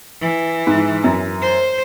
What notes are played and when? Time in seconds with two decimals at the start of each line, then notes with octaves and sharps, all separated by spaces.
0.21 E3
0.67 G#2
1.04 F#2
1.42 C5